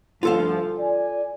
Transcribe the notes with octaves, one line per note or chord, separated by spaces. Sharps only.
D2 G2 F3 F4 A4 F5
D5 G#5